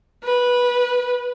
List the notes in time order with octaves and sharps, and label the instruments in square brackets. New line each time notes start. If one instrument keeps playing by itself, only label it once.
[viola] B4